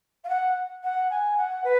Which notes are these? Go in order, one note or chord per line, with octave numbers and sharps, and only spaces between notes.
F5
F#5
F#5
G#5
F#5
B4